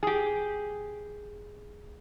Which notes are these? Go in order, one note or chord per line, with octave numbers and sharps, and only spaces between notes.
G4 G#4